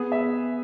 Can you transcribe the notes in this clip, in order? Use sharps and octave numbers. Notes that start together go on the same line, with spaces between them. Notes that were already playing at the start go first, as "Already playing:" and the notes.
Already playing: B3 G#4
E5